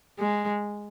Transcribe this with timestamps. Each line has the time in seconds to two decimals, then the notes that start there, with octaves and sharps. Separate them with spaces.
0.19 G#3